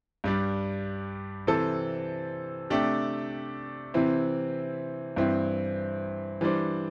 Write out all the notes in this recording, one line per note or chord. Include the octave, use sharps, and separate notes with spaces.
G2 G3 D4
C3 E3 C4 A4
C3 A3 D4 G4
C3 E3 C4 E4
G2 E3 C4 E4
E3 G3 D4 C5